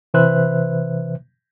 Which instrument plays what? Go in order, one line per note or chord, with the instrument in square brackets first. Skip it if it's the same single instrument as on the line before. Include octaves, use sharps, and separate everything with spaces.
[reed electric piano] C3 E3 B4 C5 E5 F#6